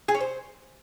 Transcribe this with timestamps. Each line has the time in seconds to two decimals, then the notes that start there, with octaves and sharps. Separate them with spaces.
0.08 G#4
0.15 C#4
0.21 C5